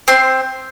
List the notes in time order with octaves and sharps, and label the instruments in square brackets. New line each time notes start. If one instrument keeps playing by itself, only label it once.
[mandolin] C4 C6